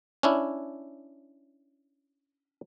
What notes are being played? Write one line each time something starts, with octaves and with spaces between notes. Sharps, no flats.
C#4 D4 E4